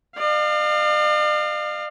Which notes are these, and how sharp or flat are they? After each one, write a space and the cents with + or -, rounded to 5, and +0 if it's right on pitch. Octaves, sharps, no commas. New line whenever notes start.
D5 +45 F5 +0